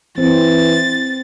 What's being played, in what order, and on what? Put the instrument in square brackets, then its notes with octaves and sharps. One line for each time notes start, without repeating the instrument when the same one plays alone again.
[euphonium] E3 [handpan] C4 [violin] A6